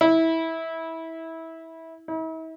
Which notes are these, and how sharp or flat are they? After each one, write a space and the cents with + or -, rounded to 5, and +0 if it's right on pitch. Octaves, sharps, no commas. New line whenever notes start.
E4 -20
E4 -45